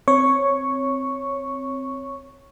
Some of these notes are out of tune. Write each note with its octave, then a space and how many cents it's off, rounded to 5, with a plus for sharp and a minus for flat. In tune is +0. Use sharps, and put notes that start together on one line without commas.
C4 +0 C#5 +0 C#6 +0